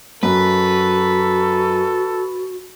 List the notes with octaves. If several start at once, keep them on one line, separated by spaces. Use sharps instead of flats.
F#2 F#4 A4 B4